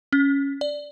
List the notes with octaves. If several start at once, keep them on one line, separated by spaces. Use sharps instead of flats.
C#4
D5